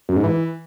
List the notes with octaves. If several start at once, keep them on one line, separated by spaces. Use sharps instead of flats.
F#2
G#2
E3